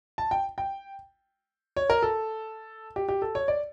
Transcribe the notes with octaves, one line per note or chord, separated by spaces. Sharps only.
A5
G5
G5
C#5
A#4
A4
G4
G4
A4
C#5
D5